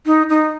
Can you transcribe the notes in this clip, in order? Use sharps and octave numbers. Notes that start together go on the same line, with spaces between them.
D#4
D#4